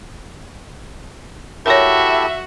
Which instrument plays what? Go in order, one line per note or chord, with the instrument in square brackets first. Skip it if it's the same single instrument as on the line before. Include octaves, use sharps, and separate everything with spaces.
[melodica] E4 G4 A4 [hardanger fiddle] F#4 [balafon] A#4 C#5 [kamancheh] E5